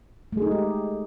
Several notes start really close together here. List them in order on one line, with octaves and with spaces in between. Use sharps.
A3 G#4 D#4 G#3 G4